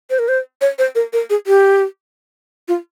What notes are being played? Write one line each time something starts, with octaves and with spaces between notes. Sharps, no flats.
C5
A#4
C5
C#5
C5
A#4
A#4
G#4
G4
F4